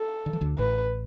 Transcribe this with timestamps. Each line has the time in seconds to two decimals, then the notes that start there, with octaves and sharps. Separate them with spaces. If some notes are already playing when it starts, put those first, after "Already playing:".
Already playing: A4
0.26 D3
0.33 E3
0.41 D2 D3
0.58 A1 A2 B4